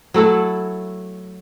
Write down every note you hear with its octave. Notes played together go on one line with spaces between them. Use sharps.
F#3 A3 E4 A4